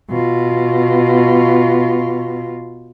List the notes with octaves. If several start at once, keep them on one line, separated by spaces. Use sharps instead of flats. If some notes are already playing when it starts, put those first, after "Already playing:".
B2 F4